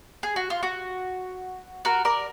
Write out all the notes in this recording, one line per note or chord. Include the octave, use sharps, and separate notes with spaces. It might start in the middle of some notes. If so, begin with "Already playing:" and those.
G#4
F#4
F4
F#4
F#4 A#4
A#4 D5